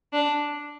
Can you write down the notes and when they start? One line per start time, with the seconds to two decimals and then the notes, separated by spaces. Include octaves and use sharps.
0.13 D4